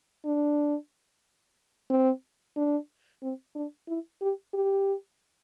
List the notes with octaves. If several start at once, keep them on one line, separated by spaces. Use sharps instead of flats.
D4
C4
D4
C4
D4
E4
G4
G4